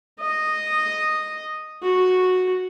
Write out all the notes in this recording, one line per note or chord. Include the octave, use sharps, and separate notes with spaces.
D#5
F#4